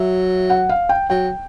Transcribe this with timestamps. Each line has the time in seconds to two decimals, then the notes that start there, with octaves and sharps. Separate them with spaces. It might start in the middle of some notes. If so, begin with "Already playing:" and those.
Already playing: F#3 E5
0.50 F#5
0.69 F5
0.89 G5
1.10 F#3 G5